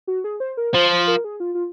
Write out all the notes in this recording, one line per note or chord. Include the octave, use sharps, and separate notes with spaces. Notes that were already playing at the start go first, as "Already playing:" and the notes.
F#4
G#4
C5
A#4
F3 C5
C5
A#4
G#4
F4
F4